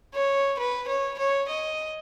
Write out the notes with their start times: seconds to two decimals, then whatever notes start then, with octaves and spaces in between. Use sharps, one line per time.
0.14 C#5
0.59 B4
0.88 C#5
1.18 C#5
1.48 D#5